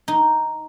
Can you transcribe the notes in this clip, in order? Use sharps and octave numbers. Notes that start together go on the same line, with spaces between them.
D#4